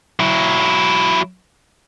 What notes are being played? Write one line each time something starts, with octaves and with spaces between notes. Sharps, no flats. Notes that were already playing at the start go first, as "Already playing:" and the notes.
F#3 E4